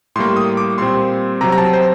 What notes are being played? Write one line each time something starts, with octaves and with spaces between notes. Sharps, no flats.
A2 G3 A#3 C6
D#6
D6
A#2 G3 C4 C6
C3 F#3 C4 A#5
A#5
A5
C5